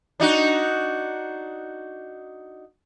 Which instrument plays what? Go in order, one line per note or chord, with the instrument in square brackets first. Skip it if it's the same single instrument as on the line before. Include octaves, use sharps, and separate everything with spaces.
[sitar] D4 D#4 F#4